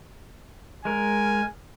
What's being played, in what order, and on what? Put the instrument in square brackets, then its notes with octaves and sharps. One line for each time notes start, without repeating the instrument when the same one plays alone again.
[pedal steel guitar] G#3 A#4 [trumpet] G#5